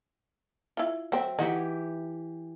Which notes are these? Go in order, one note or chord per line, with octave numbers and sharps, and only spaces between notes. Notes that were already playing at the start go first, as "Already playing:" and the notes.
E4 F4
F#3 C4 E5
E3 D#4 F#4 G4